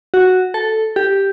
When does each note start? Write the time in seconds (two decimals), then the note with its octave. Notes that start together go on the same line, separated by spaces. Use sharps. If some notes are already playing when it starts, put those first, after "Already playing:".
0.14 F#4
0.54 A4
0.96 G4